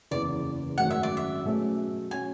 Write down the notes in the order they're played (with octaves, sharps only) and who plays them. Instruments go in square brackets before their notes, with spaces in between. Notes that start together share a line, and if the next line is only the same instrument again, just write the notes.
[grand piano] F#1 E2 C#3 E3 [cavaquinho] D5
[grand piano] G#1 F#2 C#3 F#3 A3 [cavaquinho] F#5
[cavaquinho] E5
D5
E5
[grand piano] B2 F#3 A3 C#4 G#4
[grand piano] F#3 C#4 [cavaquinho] G#5